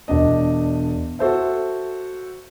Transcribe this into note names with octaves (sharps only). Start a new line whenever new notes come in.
E1 D4 D#5
F#4 A4 C5 E5